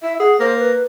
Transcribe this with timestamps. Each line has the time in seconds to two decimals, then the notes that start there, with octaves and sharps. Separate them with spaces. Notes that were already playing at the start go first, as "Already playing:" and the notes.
0.02 E4 E5
0.20 G#4 F#5
0.40 A#3 C5
0.59 B4